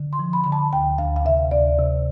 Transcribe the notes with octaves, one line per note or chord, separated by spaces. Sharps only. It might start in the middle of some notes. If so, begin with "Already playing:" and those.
Already playing: D3
C6
F3
B5
D3 B5
A5
D2 G5
D2 F5
F5
C3 E5
D2 D5
C3